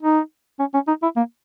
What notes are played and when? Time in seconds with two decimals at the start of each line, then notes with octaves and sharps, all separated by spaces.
0.03 D#4
0.60 C#4
0.74 C#4
0.88 D#4
1.03 E4
1.16 A#3